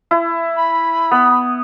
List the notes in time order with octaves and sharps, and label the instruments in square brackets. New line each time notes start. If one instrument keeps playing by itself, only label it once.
[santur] E4
[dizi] B5
[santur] B3